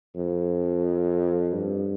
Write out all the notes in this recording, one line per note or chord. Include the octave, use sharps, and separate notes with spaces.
F2
G2